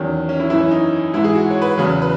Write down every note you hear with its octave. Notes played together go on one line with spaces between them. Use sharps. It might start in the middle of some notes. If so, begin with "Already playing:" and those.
Already playing: E2 D#3 F#3 C#4
C#4
E4
F#2 E3 E4
C#4
D#4
G#2 E3 E4
G#4
F#4
C#5
B4
E2 C#3 F#3
B4